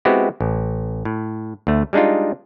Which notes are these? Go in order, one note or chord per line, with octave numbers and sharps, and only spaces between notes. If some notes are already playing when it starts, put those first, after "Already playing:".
G#3 B3 C4 E4 F#4 G4
A1
A2
D2 A3
G3 G#3 D4 D#4 F4